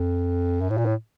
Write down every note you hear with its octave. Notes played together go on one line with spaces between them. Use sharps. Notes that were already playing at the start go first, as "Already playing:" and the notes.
Already playing: F2
F#2
A2
A#2
A2